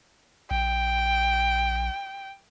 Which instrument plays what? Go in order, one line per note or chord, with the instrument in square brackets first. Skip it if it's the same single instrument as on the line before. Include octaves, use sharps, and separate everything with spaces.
[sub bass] A#1 [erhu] G5